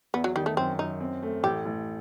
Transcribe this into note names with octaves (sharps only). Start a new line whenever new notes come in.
E2 B3
F#3
D#3 G3
A3
F#2 C4
F#2 D#4
C4
A3
A1 G4
A1